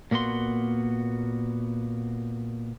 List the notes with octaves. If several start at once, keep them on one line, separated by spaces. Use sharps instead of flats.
A#2 A#3 B3 F#4 C6